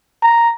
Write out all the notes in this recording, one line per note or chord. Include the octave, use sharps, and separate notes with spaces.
A#5